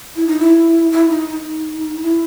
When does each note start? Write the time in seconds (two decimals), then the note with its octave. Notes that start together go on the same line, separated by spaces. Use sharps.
0.16 E4
0.27 D#4
0.39 E4
0.91 E4
1.09 D#4
1.28 D#4
2.02 E4